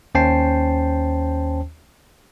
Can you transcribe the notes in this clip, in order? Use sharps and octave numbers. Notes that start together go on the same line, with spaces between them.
D#2 C#4 C5 G5 A5 C7